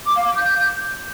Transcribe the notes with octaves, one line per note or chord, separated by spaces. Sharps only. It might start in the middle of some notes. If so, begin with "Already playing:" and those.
D6
F5
D6
G6